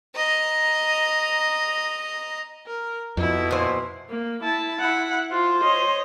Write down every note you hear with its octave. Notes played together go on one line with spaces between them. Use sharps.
D#5 A#5
A#4
F2 B2 E4
A#2 C5
A#3
E4 A5
E4 F#5
F4 C5
C#5 D#5